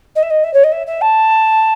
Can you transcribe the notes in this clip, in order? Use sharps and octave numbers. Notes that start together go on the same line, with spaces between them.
D#5
E5
D#5
E5
C#5
D#5
E5
E5
A5